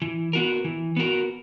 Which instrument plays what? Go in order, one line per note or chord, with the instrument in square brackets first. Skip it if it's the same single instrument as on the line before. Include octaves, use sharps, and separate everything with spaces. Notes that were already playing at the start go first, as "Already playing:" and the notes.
[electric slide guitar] E3
B3 F#4 A#4
E3
B3 F#4 A#4